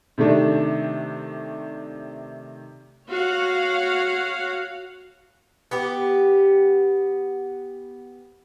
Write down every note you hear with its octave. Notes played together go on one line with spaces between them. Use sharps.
C3 D#3 A3 D4
F#4 C#5 F5 F#5
B3 G4